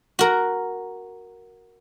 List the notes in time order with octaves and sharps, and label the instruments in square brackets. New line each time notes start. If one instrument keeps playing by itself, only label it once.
[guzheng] F#4 A#4